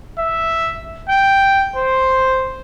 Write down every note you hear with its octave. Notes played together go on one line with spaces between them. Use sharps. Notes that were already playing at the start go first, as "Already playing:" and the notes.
E5
G5
C5